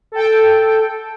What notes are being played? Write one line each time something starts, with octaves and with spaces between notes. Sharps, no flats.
A4 G5